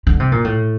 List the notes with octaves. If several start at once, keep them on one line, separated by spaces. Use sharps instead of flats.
D3
C3
A#2
A2